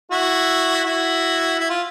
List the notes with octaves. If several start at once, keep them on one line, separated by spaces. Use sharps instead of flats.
E4 F#4
E4 F#4
E4
F4